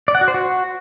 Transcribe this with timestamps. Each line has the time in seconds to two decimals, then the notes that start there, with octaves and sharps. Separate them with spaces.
0.08 D5
0.15 F#5
0.21 F#4
0.28 C5
0.34 F#4